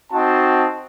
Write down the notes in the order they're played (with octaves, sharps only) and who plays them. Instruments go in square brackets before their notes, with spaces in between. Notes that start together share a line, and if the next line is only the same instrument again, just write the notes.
[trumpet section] C4 D#4 F#4 A5